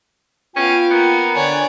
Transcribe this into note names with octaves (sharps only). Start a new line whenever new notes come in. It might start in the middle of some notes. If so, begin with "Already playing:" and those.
B3 C#4 F4 F5 G5
A#3 B3
D3 C#5 D5 G#5